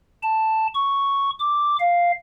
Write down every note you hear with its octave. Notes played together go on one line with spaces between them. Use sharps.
A5
C#6
D6
F5